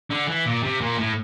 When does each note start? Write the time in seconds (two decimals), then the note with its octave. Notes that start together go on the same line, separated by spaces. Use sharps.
0.11 D3
0.28 E3
0.46 A#2
0.63 C3
0.81 A#2
0.99 A2